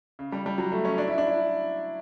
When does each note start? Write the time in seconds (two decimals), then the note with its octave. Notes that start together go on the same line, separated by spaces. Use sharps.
0.19 C#3
0.32 G3
0.46 G3
0.58 F#3
0.72 A3
0.85 C#4
0.98 D4
1.07 E4
1.18 D4
1.27 E4